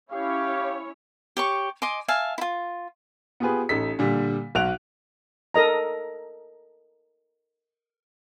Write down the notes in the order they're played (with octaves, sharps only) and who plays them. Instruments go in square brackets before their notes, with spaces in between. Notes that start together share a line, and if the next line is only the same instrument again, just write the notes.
[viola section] C#4 E4 C#5 [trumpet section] G4 F5
[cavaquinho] G4 C#5 C#6
D#5 G#5 C6 D6
E5 F5 G#5 A5
E4 F4
[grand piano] B3 F4 G4 G#4 B4
A1 D#4 A4 B6
A#2 D3 G3
B1 F#4 F#5 F#6 D7 F7
[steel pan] A4 A#4 D#5 A#5